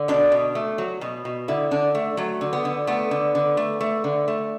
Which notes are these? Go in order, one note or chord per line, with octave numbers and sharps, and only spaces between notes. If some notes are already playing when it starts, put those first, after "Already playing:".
Already playing: D3
B2 D4
B2
A3
F#3
B2
B2
D3 E4
D3 D4
A3
F#3 A3
D3
B3
D3
A3 B3
D3
D3
A3
A3
D3
A3